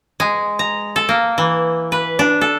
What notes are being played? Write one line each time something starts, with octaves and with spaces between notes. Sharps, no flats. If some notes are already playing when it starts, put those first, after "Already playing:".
G#3
A#5
A4
A#3
E3
B4
D4
A4